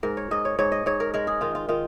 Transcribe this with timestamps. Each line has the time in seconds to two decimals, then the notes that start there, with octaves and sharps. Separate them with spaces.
0.03 G#2 A#4
0.17 C#5
0.31 G#2 D#5
0.45 C#5
0.59 G#2 C#5
0.72 D#5
0.86 G#2 C#5
1.00 A#4
1.14 G#3 A#4
1.27 G#4
1.41 D#3 F4
1.55 F4
1.69 D#3 F4